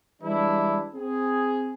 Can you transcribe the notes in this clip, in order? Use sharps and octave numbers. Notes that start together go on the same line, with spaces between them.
E3 G3 G#3 D4 E4
C4 G#4